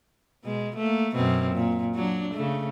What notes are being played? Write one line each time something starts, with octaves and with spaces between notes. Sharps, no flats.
B2 G#3
A3 A#3
F#2 B2 C4
A#2
F#3 D4
C#3 A3